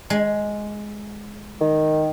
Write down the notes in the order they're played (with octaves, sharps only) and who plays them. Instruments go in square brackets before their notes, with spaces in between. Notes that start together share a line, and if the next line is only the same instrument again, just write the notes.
[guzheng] G#3
[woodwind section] D#3